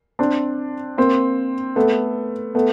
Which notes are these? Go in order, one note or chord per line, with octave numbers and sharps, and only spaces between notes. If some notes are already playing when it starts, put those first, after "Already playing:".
C4 D4
A#3 C4
A3 B3
A3 B3